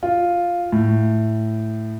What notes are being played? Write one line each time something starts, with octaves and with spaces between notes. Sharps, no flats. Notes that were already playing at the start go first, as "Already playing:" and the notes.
F4
A2